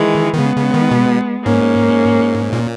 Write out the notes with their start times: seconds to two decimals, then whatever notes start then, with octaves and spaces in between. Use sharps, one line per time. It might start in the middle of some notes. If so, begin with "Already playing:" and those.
Already playing: D#3 E3 G#3
0.33 D#3
0.38 C#3 G#3 B3
0.56 C#3
0.74 D#3
0.91 B2
1.45 G#2 A#3 C#4
2.53 A#2